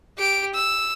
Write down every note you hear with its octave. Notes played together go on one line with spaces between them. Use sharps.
G4 D7
E6